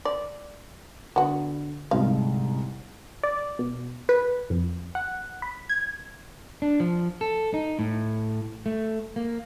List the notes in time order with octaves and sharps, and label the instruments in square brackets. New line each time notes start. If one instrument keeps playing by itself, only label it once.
[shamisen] D5
[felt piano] D3 [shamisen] B3 F#4
[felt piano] G1 C2 G#2 [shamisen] F5
[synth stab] D5
B2
B4
F2
F#5
B5
G#6
[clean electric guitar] D4
F3
A4
D#4
A2
A3
A#3